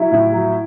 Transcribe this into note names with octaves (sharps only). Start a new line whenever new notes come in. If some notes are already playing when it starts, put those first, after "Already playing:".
Already playing: F#3 E4
A2
F#3